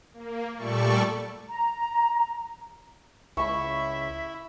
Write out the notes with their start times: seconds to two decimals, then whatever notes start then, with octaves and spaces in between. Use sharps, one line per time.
0.13 A#3
0.56 A#2 G3 A3 A4 D5 C#6
1.49 A#5
3.37 C#2 E4 E5 B5 C#6